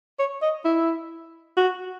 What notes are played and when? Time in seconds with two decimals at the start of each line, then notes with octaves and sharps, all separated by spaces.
0.19 C#5
0.42 D#5
0.65 E4
1.57 F#4